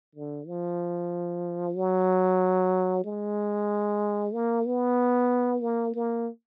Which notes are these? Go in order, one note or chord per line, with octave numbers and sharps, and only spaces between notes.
D3
F3
F#3
G#3
A#3
B3
A#3
A#3